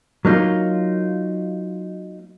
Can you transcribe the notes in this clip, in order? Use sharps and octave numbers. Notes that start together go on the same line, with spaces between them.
F#3 A#3 D#4 F4